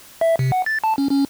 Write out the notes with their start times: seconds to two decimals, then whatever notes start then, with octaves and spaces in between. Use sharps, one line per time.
0.21 E5
0.39 C3
0.52 F#5
0.66 A6
0.84 A5
0.98 C#4
1.11 C#4